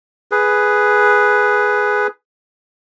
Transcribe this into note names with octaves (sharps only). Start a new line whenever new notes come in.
G#4 B4